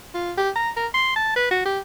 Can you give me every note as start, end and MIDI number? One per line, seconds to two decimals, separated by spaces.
0.14 0.32 65
0.38 0.50 67
0.56 0.70 82
0.76 0.87 70
0.94 1.15 84
1.16 1.31 81
1.36 1.50 71
1.51 1.63 66
1.65 1.79 67